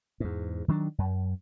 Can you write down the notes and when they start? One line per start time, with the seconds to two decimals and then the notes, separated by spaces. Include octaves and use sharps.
0.20 E2 G#2
0.68 D#3 F#3 C#4 D4
0.98 F#2